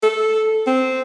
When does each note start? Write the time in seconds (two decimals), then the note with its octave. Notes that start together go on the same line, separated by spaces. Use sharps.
0.03 A4
0.67 C4